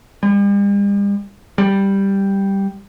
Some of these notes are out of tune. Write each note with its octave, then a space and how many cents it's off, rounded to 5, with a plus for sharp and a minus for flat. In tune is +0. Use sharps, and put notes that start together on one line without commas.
G3 +45
G3 +0